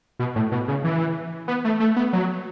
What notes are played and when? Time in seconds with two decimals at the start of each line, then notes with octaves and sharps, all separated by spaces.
0.19 B2
0.36 A2
0.52 B2
0.68 C#3
0.84 E3
1.48 B3
1.65 A3
1.80 A3
1.96 B3
2.13 F#3